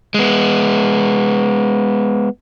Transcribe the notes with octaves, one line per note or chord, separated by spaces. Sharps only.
G#3 B3